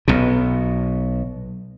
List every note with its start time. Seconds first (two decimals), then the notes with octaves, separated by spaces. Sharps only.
0.08 B1 B2